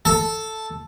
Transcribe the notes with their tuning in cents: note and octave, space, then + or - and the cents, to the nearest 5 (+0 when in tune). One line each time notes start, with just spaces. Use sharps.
A4 +0 A5 +0